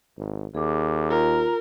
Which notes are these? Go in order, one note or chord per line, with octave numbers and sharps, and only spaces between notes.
G#1
D#2 G#4 D6
F4 A#4